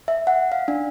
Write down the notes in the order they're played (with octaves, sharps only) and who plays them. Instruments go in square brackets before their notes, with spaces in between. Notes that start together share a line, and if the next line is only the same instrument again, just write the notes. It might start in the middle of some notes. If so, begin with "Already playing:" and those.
[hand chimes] E5
F#5
F5
D4